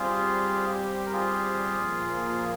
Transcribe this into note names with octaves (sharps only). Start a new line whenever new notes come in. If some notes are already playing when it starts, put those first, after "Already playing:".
Already playing: G3 C4 F4 G4 G#4
A#4
F4 G#4
A#2 F3 A#3